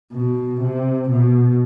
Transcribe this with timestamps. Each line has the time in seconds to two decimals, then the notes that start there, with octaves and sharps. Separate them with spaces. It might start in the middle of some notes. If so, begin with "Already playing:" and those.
0.13 B2
0.62 C3
1.11 B2